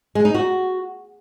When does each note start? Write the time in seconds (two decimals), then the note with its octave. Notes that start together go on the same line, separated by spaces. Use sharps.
0.15 G#3
0.25 D#4
0.34 F#4